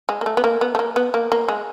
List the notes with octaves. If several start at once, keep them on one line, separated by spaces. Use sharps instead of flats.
G#3
A#3
A3
B3
A#3
B3
A3
A#3
B3
A#3
A#3
G#3